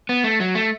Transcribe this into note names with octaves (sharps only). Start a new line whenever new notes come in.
B3
A3
F#3
A3